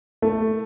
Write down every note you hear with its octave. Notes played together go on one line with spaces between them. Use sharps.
A3